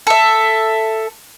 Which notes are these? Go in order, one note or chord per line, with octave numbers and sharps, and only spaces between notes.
A4 E5